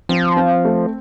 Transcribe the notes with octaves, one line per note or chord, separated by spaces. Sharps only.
F3 C4
C4
A3